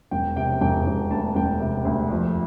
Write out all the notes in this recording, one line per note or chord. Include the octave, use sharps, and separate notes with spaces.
E1 G5
C3 G5
E1 G5
E1
D2 A5
E1 G5
C3
D2
F2